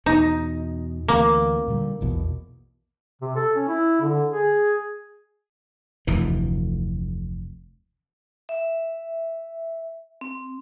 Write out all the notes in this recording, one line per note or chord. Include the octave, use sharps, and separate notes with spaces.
E2 B2 D#4
D2 E3 A#3 C4
A#2 D3 G3
A#1 E2 B2
C3
A4
C#4
E4
D3
G#4
F1 D2 E3
E5
C4